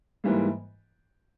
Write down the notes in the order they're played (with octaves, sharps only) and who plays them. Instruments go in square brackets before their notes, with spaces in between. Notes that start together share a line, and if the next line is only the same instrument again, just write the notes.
[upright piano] G#2 E3 G3 A#3